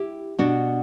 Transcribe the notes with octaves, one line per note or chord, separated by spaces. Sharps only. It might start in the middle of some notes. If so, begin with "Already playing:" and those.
Already playing: E4 G4
B2 D4 F#4